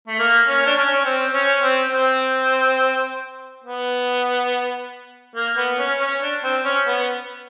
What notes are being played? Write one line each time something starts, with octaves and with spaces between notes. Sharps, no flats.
A3
A#3
C#4
D4
C#4
C#4
C4
C#4
C4
C4
B3
A#3
B3
C#4
C#4
D4
C4
C#4
B3